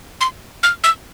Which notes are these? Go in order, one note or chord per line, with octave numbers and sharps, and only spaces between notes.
C6
F6
E6